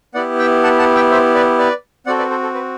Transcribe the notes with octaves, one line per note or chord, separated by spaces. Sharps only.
B3 E4 G4 D5 F#5
E5 G5
F#5 A5
F#5 A5
E5 G5
C5 E5
B4 D5
B4 D5
C4 F#4 A4 D5 F#5
B4 D5
A4 C5
A4
B4